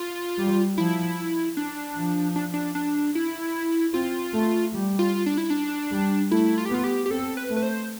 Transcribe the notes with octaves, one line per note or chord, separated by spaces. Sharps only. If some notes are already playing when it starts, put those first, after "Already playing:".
Already playing: F4
G3
F3 E4
D4
F3
D4
D4
D4
E4
C4 F4
A3
G3
F4
D4
E4
D4
G3
A3 E4
F4
G4
B3 F4
G4
G4
C4 A4
B4
A3
B4
C5